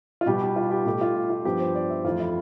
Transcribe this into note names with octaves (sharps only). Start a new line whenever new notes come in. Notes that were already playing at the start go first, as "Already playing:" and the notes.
F4
B2 G3 B3 G4
G4
F4
G4
B2 A3 G4
F4
F4
G2 F3 B3 G4
C5
D5
E5
F2 E3 A3 F4
E4